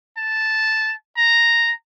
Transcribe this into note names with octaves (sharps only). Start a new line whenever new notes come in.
A5
A#5